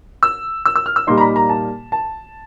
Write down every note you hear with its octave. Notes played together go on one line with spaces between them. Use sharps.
E6
E6
E6
F6
E6
A#2 G3 A#3 D#4 C6
A#5
B5
A#5
A5
A5